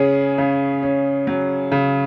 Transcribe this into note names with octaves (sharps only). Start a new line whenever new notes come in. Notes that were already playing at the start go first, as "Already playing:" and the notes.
Already playing: C#3 C#4 G#4
C#3
C#4
F#3
C#3